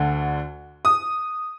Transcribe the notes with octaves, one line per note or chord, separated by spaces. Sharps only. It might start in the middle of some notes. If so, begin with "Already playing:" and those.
Already playing: D2 D3
D#6